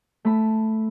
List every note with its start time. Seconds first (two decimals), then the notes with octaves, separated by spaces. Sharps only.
0.25 A3 B5